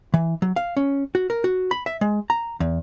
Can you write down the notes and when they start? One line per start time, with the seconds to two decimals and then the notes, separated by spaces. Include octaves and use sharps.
0.14 E3
0.42 F#3
0.56 F5
0.77 C#4
1.15 F#4
1.30 A#4
1.44 F#4
1.71 B5
1.86 E5
2.01 G#3
2.30 A#5
2.60 E2